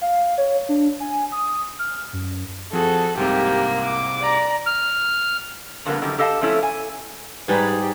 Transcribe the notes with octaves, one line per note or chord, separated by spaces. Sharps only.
F5
C#5
D4
G#5
D#6
F6
F#2
F3 C4 F#4 G#4 A4
C2 G#2 C3 A#3 G4
D6
D5 A#5
F6
F2 D3 G3 A#3 B3
F#2 D3 D#3 G3
G4 A4 D#5 F5 G#5 A5
F3 A3 C4 C#4 E4 A4
G#5
G#2 G3 G#4 B4
G4